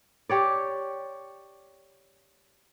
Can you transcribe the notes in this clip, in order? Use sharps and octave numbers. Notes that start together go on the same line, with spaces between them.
G4 C#5 D5